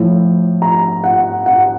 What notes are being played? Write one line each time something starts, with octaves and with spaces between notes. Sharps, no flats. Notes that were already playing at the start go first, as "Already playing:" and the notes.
Already playing: A2 F3
A#5
F#5
F#5